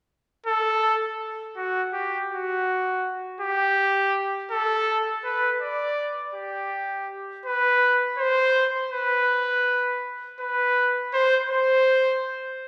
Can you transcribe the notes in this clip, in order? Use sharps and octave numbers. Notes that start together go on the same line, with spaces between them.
A4
F#4
G4
F#4
G4
A4
B4
D5
G4
B4
C5
B4
B4
C5
C5